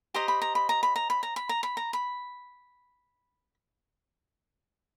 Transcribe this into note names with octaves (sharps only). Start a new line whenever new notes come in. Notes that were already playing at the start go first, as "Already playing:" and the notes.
G4 C5 D#5 A#5
B5
A#5
B5
A#5
B5
A#5
B5
A#5
B5
A#5
B5
A#5
B5